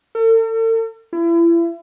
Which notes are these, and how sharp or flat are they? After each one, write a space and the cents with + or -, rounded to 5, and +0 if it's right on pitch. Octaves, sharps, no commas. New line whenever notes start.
A4 +45
E4 +35